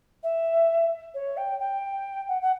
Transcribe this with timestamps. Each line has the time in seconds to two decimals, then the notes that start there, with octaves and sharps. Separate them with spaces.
0.23 E5
1.14 C#5
1.37 G5
1.60 G5
2.28 F#5
2.42 F#5